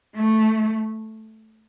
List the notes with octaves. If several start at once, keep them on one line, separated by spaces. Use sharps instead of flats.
A3